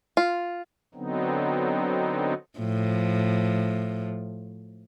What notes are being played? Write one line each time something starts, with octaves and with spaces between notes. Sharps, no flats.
F4
D3 F#3 B3 C4 D#4
A2 F3